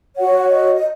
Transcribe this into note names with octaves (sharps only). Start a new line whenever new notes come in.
F#4 C#5 F#5
D#5
D#5